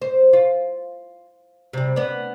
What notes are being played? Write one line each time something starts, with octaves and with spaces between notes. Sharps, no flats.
C5
F4
C3 G3
B3 D4